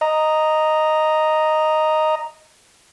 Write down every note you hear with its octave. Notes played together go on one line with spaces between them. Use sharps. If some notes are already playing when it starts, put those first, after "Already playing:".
D#5 A#5